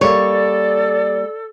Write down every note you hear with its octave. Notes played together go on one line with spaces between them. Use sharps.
G3 A#3 A4 C#5 D5